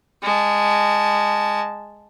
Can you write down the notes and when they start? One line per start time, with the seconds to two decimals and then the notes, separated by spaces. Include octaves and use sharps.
0.23 G#3 A5